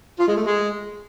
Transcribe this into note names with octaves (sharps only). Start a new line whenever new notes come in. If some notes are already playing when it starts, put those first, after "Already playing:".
F4
G#3
A3
G#3